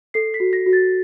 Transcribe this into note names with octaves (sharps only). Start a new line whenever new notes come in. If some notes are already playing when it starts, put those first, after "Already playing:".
A4 C7
B6
F#4
A#6
F#4
A6